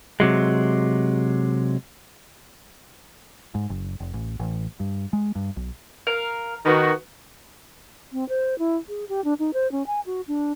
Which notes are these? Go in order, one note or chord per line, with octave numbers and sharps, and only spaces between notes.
C3 F#3 G#3
G#2
F#1
F1
A1
A1
G2
G#3
G2
B1
A#4 F5
D#3 B3 F#4
C4
C5
E4
G#4
G4
D4
D#4
C5
C#4
G#5
F#4
D4